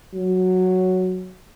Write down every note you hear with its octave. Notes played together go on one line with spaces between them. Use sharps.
F#3